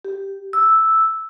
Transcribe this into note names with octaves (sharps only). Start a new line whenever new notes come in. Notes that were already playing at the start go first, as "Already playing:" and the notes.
G4
E6